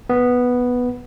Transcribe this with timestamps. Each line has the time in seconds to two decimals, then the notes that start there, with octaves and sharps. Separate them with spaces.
0.10 B3